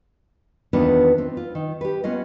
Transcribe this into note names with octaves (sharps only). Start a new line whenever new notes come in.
E2 D#3 B3 D4 F4 B4
C4
F4
D#3
G4 B4
B3 C#4 F4 D#5